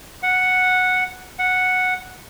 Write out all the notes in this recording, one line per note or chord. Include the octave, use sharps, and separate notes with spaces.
F#5
F#5